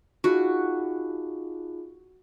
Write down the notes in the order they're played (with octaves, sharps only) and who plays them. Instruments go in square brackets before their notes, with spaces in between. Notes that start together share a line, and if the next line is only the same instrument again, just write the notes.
[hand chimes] D#4 F4 G#4 [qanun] F#4